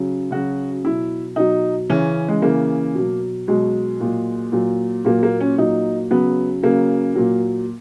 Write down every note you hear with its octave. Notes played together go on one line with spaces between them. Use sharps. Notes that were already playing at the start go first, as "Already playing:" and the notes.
Already playing: C#3 F#3
C#3 F#3 F#4
B2 F#3 E4
B2 F#3 D#4
C#3 E3 C#4
G#3
C#3 E3 A#3
B2 F#3
B2 F#3 G#3
A#2 F#3
A#2 F#3
A#2 F#3 A#3
A#3
C#4
A#2 F#3 D#4
C#3 F#3 B3
C#3 F#3 A#3
A#2 F#3